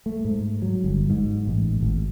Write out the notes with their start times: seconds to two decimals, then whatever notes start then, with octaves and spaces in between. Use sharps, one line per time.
0.06 A3
0.24 G#2
0.62 F#3
0.84 G1
1.10 G#2
1.47 A1
1.81 G#1